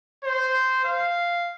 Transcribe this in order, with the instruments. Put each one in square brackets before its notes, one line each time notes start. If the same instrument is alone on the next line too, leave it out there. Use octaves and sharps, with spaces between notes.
[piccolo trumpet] C5
F5